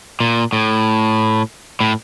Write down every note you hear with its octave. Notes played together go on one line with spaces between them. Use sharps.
A#2
A2
A2